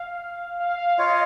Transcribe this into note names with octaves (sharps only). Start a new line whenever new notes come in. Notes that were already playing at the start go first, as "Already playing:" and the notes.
Already playing: F5
F5
F5
F4 C#5 D#5 F5